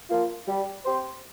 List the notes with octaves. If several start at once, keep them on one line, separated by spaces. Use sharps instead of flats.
F3 A#3 F4
G3
C4 G4 C5